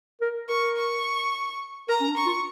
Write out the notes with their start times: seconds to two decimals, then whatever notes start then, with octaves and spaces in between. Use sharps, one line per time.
0.21 A#4
0.49 A#4 C#6
0.77 C#6
1.89 A#4 A#5
2.01 C#4
2.08 D4
2.17 C#6
2.26 F4